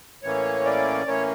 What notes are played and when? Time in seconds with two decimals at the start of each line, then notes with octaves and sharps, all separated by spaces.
0.23 A2 E3 A#3 C#4 C#5
0.65 D5
1.07 A2 E3 A#3 C#4 C#5